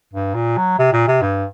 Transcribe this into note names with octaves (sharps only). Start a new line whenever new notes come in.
G2
A#2
F#3
C3
A#2
C3
G2